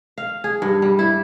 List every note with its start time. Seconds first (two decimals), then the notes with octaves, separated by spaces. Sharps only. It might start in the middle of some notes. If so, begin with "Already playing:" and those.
0.18 F5
0.44 G#4
0.62 G2
0.82 G3
0.99 E4